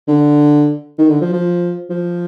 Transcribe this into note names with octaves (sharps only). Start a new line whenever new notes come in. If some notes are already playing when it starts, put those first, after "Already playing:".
D3
D#3
D3
F3
F3
F3